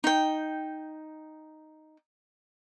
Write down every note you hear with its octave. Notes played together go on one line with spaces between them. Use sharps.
D#4 G5